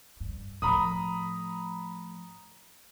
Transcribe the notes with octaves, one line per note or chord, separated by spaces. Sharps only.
G2
A2 F3 A#5 B5 D#6